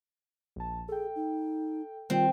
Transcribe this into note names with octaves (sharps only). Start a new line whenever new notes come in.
A#1 A5
G#4 A4 G5
D#4
D#3 G3 C4 F4